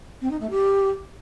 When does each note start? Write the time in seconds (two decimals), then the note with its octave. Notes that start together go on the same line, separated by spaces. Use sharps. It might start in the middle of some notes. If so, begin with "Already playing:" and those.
0.21 C4
0.31 D#4
0.41 A3
0.50 G4